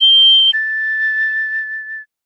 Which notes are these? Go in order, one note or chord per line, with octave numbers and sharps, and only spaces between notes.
G7
A6